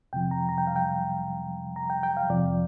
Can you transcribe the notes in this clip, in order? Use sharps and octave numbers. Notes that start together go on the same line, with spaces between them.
F2 C3 F3 G5
A#5
A#5
G5
F5
G5
A#5
G5
G5
F5
F2 C3 F3 D5